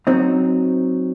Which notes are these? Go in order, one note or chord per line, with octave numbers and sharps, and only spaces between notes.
F#3 C4 D#4